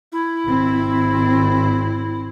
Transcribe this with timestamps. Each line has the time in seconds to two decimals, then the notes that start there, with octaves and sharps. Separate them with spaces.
0.12 E4
0.46 G#1 C4